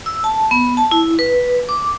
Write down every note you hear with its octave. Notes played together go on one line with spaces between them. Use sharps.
E6
A5
B3
A5
E4
B4
D6